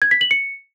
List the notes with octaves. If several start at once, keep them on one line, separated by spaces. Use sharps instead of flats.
G#6
B6
F#7
C#7